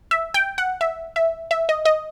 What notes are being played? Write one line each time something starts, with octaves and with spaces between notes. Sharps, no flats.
E5
G5
F#5
E5
E5
E5
D#5
D#5